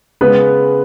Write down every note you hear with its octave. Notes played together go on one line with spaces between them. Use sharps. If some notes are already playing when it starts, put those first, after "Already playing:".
C#3 G#3 B3 B4